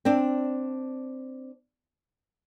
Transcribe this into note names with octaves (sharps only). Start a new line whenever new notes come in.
C4 D4